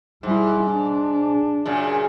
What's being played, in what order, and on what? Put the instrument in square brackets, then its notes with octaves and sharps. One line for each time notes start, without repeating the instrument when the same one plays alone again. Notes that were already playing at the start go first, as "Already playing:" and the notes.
[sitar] G#2 [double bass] G3 E4
[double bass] D4
[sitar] F#2 A#2 C#3